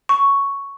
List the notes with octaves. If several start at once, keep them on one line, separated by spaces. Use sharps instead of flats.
C#6